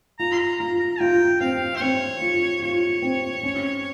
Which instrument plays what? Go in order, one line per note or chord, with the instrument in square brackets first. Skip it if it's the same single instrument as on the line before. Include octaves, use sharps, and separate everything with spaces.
[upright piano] F4 [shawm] A#5
[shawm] C6
A#5
[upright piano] F4 [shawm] A#5
[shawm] A#5
[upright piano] F4 [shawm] G5
[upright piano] C4 [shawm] F5
[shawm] C5
[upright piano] C4 [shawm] C#5
[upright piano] F4
[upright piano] F4 [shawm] C#5
[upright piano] C4
C#4